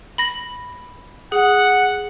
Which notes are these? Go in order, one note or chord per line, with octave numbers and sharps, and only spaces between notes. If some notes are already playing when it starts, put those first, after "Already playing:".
B5 A#6
G#4 F#5